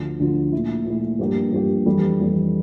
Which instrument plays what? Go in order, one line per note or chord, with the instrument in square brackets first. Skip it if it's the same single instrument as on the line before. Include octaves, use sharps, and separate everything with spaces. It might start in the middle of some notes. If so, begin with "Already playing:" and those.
Already playing: [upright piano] D2 D3 F3
D2 D3 F3
A#2 A3 E4
A#2 A3 E4
G2 F3 A#3 D4 G4
G2 F3 A#3 D4 G4
F2 E3 G3 D4 A4
F2 E3 G3 D4 A4